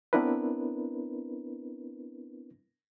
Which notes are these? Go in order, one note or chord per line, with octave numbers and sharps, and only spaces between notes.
B3 C4 D4 E4 A#4 B4